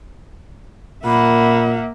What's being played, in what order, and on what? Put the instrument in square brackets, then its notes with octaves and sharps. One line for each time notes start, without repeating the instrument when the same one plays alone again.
[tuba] A#2 [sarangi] A#3 [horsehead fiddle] E5 F#5 [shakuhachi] B5